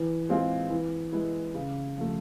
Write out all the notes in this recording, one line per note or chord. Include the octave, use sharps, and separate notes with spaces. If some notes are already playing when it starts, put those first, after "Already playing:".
Already playing: E3
G#3 C4 F4 G#4
E3
G#3 B3 E4
C#3
F3 A3